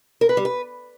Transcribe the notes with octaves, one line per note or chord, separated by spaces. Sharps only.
A#4
B4
G3
B4